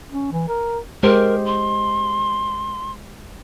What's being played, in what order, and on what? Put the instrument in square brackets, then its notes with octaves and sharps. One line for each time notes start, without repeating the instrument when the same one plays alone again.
[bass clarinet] C#4
E3
A#4
[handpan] G#3 G4 C5 [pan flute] A#4
[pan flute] C6